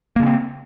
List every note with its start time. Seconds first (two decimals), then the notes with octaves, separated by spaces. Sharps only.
0.16 A#3
0.20 C#3
0.23 C#4
0.26 C4